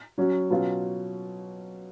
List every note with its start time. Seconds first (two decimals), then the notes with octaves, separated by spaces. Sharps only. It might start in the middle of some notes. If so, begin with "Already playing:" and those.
0.18 F#3 C#4 F#4
0.50 B2 F#3 C#4 F4